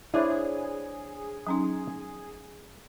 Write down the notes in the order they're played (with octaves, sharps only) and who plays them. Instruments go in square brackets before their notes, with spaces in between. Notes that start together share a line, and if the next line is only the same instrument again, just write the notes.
[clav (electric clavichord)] D4 C5 C#5 [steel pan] E4 [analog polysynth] G#4
[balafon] F#3 C#4 D#4